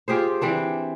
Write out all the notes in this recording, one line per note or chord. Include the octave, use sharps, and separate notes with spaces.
F4 G4 G#4 C5
E3 C4 D4